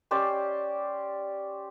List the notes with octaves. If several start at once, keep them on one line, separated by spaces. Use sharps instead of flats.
C#4 G4 C5 D5